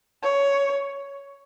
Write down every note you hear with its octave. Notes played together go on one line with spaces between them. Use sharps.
C#5